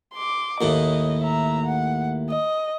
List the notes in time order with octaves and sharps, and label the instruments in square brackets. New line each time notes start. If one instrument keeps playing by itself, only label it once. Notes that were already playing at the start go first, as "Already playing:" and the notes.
[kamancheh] C6 D6
[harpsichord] D#2 A2 [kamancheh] D#5
[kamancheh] E5 A#5
F#5
D#5